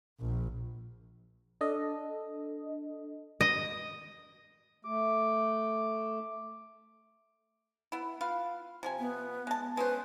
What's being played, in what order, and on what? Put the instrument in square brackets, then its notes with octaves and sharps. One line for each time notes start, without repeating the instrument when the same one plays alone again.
[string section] A#1
[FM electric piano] D4 A4 D#5
[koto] D#5
[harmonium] A3 [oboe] D6
[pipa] B3 E4
F4 B4 F5
C3 F3 G#5
[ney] B3
[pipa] G#3 A5
[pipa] G#3 C#4 C5 [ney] B4